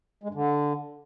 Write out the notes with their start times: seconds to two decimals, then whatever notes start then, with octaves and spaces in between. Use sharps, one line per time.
0.23 G#3
0.29 G2
0.34 D3